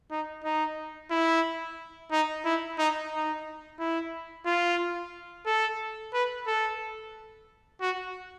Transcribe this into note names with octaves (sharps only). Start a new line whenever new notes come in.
D#4
D#4
E4
D#4
E4
D#4
D#4
E4
F4
A4
B4
A4
F#4